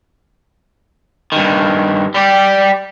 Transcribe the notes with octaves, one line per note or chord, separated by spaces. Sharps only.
G2 D#3
G3 G4